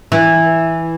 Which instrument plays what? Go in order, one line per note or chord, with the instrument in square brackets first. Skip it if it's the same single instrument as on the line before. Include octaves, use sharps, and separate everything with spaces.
[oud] E3